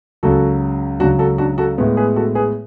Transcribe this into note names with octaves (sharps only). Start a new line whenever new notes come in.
C#2 C#3 F#3 F#4 A4
C#2 C#3 F#3 D4 F#4
F#4 A4
D4 F#4
F#4 A4
A2 G#3 B3
G#4 B4
F#4 A4
G#4 B4